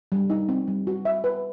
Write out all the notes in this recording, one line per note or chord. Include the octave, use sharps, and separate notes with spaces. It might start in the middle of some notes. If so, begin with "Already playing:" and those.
G3
D#4
C4
G3
F#4
E5
B4